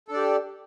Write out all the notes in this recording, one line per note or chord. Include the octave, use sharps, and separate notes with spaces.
D4 G4 A4 D5